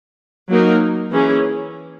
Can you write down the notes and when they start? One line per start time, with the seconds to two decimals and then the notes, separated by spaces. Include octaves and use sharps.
0.49 F#3 A#3 D#4 A#4
1.11 E3 A#3 C#4 G#4